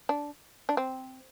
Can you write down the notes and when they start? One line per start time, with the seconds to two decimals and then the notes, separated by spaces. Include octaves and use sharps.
0.09 D4
0.69 D4
0.77 C4